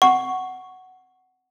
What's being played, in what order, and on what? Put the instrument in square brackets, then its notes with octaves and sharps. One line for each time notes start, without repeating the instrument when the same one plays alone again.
[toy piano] F#5 [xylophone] C#6